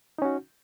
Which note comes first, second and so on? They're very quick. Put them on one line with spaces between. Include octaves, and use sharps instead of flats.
D#4 C#4 F#4